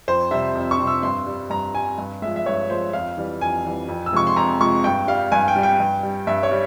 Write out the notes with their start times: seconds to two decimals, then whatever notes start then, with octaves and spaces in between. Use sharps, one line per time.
0.08 F2 C5
0.31 C3 G3 E5
0.55 F2
0.71 C#6
0.79 C3 G3
0.87 E6
1.03 G2 C6
1.26 G3
1.50 G2 A#5
1.74 G3 G#5
1.98 G2
2.22 F3 G#3 E5
2.36 E5
2.46 G2 C#5
2.70 F3 G#3 C5
2.93 F2 F5
3.17 E3 G3
3.41 F2 G#5
3.65 E3 G3
3.88 F2
4.06 E6
4.13 C3 F3 G#3 C#6
4.27 C6
4.36 F2 A#5
4.60 C3 F3 G#3 C#6
4.84 G2 G5
5.08 G3 F5
5.32 G2 G#5
5.48 G5
5.56 G3
5.63 G5
5.80 G2
6.03 G3
6.27 G2 E5
6.43 C#5
6.51 G3